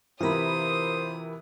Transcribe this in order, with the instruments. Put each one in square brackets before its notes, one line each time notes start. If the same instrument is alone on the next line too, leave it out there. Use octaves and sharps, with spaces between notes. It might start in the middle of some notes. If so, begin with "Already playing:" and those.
[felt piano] C3 E3 [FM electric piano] F4 A#4 B5 [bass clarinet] C5 [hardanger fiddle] D#6